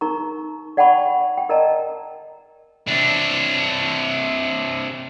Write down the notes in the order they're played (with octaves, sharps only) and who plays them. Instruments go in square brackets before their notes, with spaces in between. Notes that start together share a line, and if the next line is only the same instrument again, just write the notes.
[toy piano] D#4 A#4 A#5 C#6
D5 F#5 G5 A5 B5 C#6
G5
A#4 D5 D#5 A5 A#5
[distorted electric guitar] C3 D4